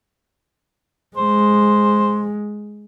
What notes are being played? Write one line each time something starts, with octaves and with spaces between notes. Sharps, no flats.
G#3 C5